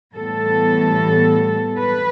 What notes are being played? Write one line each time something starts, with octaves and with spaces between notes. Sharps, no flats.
A2 E3 G3 B3 A4
B4